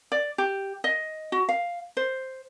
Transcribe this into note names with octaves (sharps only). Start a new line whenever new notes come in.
D5
G4
D#5
F#4
F5
C5